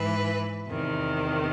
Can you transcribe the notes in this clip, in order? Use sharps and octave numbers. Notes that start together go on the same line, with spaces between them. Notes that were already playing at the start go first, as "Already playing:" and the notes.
Already playing: G#2 E3 B4
E2 C3 D#3